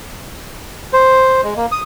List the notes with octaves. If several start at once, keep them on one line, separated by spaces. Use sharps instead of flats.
C5
G#3
A#3
D#6